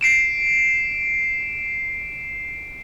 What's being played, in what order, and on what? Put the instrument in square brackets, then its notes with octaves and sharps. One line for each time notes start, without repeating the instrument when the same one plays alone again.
[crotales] C7 D7 E7